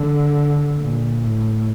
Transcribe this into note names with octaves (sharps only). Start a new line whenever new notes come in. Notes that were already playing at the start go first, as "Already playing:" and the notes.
Already playing: D3
A#2
A2